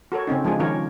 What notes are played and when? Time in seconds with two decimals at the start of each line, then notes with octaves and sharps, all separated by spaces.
0.12 F#4 A4 A#4 C#5
0.27 C#3 C4 C#4 D#4
0.45 F3 G#3 D4 G#4
0.60 D#3 C#4 D#4 F4 A#4 C#5